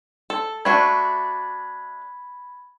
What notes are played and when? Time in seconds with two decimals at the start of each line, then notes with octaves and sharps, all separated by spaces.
0.30 A4
0.65 A3 D4 F#4 B5 G#6